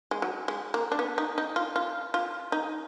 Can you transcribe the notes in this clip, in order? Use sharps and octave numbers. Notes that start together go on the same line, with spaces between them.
G#3
F#3
G#3
A#3
D4
B3
D#4
D#4
F4
F4
F4
D#4